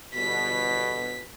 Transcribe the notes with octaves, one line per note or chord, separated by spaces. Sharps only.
G1 B2 B6